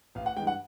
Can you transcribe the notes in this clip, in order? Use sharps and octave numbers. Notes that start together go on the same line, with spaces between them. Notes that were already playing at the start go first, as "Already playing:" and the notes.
A1 F5
F#5
G2 E3 G#3 G5
F#5